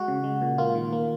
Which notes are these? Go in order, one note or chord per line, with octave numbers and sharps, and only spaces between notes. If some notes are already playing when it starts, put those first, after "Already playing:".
Already playing: G#3 F#4
C#3
G#3
A#2
A#3 F4
D#3
A#3